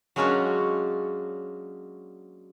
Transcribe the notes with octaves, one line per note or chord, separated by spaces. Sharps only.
F#3 G#3 A#3 C#4 D4 F#4